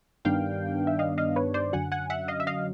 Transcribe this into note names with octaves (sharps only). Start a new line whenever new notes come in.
G2 D#3 G3 B3 D4 F5 G5
E5
D#5 F5
D#5 F5
B4 C#5
C5 D5
F#2 D3 F#3 F#5 G#5
F#5 G#5
E5 F#5
D#5 F5
E5
D#5 F5